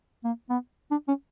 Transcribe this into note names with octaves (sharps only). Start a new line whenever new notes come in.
A#3
B3
D4
C#4